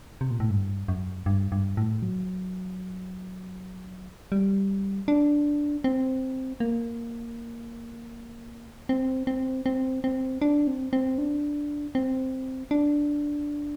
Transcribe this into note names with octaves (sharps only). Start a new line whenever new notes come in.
C3
A#2
A2
G2
F#2
G2
G2
A2
F#3
G3
D4
C4
A#3
C4
C4
C4
C4
D4
C4
C4
D4
C4
D4